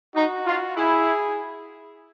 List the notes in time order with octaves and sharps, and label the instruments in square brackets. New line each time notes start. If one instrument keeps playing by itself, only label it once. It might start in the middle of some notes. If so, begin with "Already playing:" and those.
[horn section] D#4 [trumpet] F#4
[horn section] F4
[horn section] E4 [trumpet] G#4